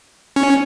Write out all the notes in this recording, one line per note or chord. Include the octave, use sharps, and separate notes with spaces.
C#4